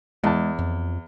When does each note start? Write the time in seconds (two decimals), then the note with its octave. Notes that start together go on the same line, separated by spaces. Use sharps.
0.24 E2 G#3 A5
0.59 F2